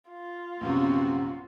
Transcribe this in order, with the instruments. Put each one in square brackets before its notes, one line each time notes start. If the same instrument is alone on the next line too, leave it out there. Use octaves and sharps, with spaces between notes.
[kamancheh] F4
[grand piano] A#1 F#2 C3 [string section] B3 C4 F#4